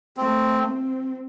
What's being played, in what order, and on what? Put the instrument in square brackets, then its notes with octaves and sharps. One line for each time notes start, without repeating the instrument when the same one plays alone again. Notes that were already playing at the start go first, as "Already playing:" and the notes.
[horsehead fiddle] A3 [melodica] C4
[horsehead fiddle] C4